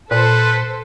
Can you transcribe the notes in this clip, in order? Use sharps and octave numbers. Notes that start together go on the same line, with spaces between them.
A#2 A4 B4 C5